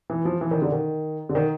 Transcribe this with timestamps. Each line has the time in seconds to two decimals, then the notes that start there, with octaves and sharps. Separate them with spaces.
0.10 E3
0.25 F3
0.41 E3
0.51 D#3
0.62 D3
0.72 D#3
1.29 D3
1.35 D#3